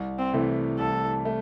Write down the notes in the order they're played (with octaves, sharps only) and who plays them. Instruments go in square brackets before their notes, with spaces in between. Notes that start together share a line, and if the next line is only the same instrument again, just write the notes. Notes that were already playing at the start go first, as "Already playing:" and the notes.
Already playing: [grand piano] C2
[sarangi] C4
[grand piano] C3 E3 A3
[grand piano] C2 [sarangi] A4
[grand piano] A3